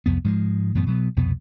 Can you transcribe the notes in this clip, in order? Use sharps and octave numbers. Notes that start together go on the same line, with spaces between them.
C2 F2 B3
G#2 F3 G3 G#3
F#2 A2 E3 B3
B2 F#3 B3
C2 F2 B2 B3